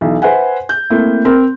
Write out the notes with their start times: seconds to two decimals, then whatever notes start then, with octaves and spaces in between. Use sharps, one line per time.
0.01 B1 E3
0.22 B4 C5 E5 F#5 G#5
0.69 G6
0.90 A3 A#3 C4 E4
1.25 C4 A#4